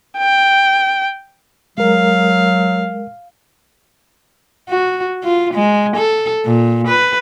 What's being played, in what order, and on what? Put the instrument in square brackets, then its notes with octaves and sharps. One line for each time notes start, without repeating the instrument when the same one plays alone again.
[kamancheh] G5
[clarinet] F#3 [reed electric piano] G#3 A#4 [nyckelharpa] F5
[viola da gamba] F#4
F4
G#3
A4
A#2
B4